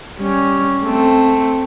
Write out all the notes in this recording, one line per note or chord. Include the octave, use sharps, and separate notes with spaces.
G3 C#4
A3 C4